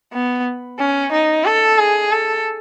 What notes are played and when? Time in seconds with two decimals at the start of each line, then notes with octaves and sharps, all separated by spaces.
0.13 B3
0.79 C#4
1.12 D#4
1.45 A4
1.78 G#4
2.11 A4